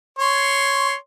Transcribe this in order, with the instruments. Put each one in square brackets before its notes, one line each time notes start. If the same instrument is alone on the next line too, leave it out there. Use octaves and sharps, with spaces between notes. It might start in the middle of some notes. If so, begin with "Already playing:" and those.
[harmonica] C#5 C6